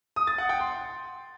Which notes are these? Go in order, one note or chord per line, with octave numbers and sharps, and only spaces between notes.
D#6
A6
F#5
G5
C6